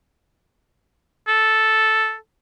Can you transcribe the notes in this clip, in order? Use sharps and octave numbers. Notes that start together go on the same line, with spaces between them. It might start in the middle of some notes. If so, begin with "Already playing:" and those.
A4